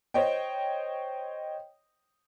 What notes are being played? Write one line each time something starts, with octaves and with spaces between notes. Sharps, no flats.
C5 C#5 D#5 G5